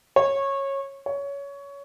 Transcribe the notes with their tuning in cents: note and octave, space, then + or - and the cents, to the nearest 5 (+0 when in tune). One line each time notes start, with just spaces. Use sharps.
C#5 -15
C#5 +20